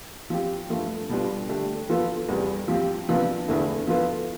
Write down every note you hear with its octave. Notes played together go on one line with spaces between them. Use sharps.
F3 C4 G4
G2 F3 A3
B2 G3 D4 F4
D3 A3 D4 G4
F3 B3 F4 A4
E2 C3 G3
F3 C4 G4
C3 F3 B3 D4
E2 D3 A3 E4
F3 B3 F4 A4